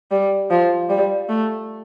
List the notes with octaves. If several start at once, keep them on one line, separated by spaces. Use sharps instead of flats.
G3
F3
G3
A3